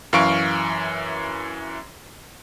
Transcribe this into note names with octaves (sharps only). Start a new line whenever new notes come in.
F#2 E3 F5 C#6 D7